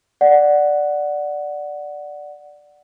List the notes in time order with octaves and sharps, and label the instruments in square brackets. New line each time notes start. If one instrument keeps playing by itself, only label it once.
[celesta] D5 F#5